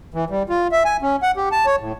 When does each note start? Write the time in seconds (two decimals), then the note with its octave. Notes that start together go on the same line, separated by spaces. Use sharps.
0.14 E3
0.30 G3
0.49 F4
0.72 E5
0.85 G#5
1.02 C#4
1.23 F#5
1.37 G4
1.52 A5
1.66 C#5
1.80 A2